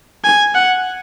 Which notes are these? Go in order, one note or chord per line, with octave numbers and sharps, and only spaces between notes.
G#5
F#5